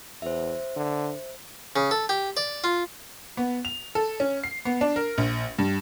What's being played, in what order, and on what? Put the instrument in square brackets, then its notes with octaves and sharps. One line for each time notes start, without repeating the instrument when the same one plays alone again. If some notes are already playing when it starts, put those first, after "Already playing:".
[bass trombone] E2 [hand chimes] C5 E5
[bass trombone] D3
[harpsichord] C#3
A4
G4
D5
F4
[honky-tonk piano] B3
F7
A4
C#4
C7
B3
D4
A#4
A#1
G2